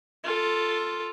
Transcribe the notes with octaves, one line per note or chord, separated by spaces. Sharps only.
F4 A4